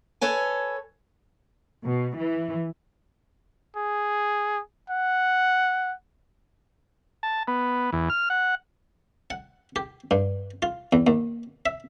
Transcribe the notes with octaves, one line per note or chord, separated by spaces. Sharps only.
A4 B4 C#5 G#5
B2
E3
G#4
F#5
A5
B3
E2
F6
F#5
F#5
G4
G2
F4
E2
D#2
E5